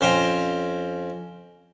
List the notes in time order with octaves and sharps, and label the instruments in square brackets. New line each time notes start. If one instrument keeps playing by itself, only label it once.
[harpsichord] F2 C#4 C5 G5 A#5 C6